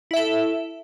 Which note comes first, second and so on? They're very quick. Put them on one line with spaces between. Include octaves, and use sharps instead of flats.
E4 E5 A4